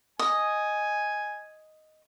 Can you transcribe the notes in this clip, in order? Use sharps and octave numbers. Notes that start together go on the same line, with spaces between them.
D#5 G#5